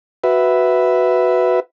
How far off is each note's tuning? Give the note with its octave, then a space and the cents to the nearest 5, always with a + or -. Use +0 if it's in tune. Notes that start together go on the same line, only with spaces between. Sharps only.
F#4 +0 B4 +5 E5 +0